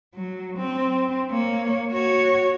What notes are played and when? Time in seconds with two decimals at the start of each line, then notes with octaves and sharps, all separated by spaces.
0.14 F#3
0.58 C4
1.30 A#3 C#5
1.92 F#4 C#5